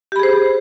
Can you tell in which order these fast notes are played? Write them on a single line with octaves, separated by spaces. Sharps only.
G4 B5 G#4 C5